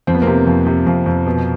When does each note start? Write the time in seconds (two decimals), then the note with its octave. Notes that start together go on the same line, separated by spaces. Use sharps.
0.07 F2 C4
0.15 B3
0.22 A#3 C4
0.27 C3
0.47 F2
0.67 C3
0.87 F2
1.06 F2
1.27 B2